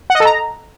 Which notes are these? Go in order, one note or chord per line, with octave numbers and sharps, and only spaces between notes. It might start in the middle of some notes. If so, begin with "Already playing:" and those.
F#5
D#5
A4
A#5